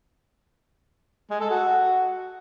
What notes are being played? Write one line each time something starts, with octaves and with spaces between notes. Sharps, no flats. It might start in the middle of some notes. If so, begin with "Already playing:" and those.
G#3
A4
F#4